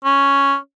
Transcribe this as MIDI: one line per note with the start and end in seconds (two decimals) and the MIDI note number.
0.05 0.56 61